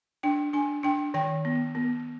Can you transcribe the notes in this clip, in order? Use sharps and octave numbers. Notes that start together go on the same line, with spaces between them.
D4 G5
D4 G#5
D4 G5
D#3 G5
B3
B3